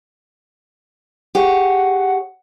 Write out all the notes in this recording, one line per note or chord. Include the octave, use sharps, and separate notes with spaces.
G4 G#4 C#5 F#5